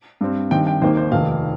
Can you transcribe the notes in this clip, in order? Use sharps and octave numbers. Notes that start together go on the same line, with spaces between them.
G2 G3 C4
G2 D#3 C4 G5
G5
D#2 D#3 A#3 C5
C5
F1 D#2 D#3 F5